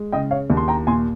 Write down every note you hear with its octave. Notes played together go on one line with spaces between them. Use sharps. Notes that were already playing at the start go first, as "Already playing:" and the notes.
Already playing: G#3
C#3 D#5 G5
C#5 F5
D#2
C6
G5 A#5
A#2 G#5 C6